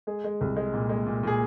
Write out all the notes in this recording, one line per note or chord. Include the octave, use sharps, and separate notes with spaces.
G#3 G#4
G#3
C2
G#3
A#2
G#3
A#2
A#2 G#4